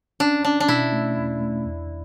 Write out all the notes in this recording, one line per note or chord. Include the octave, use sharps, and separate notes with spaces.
C#4 D4
C#4 D4
D4
B2 E4
A3
E2
A3
E2